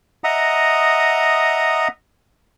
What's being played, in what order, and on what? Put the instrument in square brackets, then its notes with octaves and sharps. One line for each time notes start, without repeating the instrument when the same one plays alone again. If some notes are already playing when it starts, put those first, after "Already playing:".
[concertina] D#5 E5 F#5 A#5 D#6